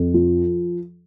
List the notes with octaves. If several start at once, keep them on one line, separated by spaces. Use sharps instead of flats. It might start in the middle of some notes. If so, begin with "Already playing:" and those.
Already playing: F2
F3